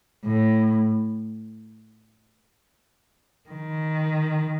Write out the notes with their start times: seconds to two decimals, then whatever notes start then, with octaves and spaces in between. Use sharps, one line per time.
0.25 A2
3.50 D#3